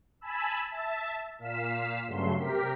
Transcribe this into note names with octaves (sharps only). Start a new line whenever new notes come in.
G#5 A5 B5 E6
E5 A5
A#2 F5 B6 E7
G2 C#3 F#3 A3 C6
C3 G4 A#4 B6